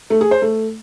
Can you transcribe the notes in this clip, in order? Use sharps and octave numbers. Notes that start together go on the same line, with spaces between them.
A3
G#4
C5
A3